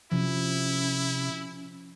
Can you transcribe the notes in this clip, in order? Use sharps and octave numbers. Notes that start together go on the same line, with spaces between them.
C3 F3 C#4 E4